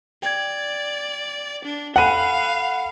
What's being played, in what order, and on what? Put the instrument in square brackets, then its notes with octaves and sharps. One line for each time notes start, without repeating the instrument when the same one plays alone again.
[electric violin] D5 [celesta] G5 G#6
[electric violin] D4
[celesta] A4 G#5 B5 [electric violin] F5 [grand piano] F#5 D#7